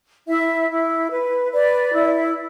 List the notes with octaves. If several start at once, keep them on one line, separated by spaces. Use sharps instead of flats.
E4 E5
E4
B4
B4 D5
E4